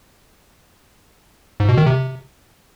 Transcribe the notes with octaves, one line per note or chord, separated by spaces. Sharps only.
G#2
B2
D#3
C3